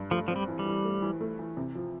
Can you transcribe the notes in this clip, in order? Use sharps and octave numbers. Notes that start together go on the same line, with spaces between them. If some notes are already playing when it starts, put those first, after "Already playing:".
Already playing: G2
F3 A3
F3 C4
G3
E3
G3
E3
A3
E3
A3
E3
C3
F3